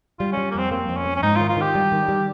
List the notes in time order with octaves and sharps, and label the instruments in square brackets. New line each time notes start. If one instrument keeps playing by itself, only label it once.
[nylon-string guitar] G3 [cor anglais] F4
[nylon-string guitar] G3 [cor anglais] C#4
[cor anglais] A#3
[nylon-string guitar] F2 [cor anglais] C4
[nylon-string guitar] A#3 [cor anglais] C4
[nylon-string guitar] F2
[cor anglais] C#4
[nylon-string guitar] A#3
[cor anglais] C#4
[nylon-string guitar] G#2 [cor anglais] D#4
[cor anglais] F4
[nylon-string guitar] D#3
[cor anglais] F4
[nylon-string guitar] D#3 [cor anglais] G4
[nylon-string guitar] G3
D#3
G3